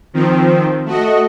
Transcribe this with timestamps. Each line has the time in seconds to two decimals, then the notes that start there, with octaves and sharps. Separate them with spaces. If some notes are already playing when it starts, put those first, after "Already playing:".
0.14 D#3 F3 C4
0.86 A3 F#4 D#5